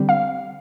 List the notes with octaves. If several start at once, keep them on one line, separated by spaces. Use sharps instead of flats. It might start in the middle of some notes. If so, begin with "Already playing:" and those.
Already playing: D3 G3 C4
F5